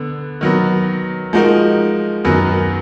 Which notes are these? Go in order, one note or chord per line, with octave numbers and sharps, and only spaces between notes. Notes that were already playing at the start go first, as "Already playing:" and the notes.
Already playing: D3 B3
D#3 F#3 B3
F3 G#3 D#4 F#4 A#4
F#2 D#3 F#3 B3